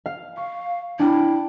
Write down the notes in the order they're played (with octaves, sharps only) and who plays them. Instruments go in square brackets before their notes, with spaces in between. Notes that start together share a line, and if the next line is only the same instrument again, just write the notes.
[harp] F5
[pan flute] F5 [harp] C#6
[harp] D4 G5 D7 [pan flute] E4